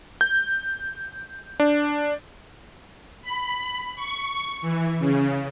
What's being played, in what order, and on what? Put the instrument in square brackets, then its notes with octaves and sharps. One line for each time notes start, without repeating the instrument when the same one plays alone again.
[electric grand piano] G6
D4
[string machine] B5
C#6
E3
C#3